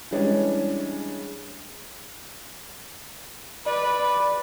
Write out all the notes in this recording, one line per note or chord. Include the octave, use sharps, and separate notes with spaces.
E3 G3 G#3 C#4 D4
B4 D5